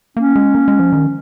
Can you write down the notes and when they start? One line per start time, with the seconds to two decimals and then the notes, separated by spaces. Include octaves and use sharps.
0.17 A#3 C#4
0.36 G#3
0.55 A#3
0.68 G#3
0.79 F3
0.93 D#3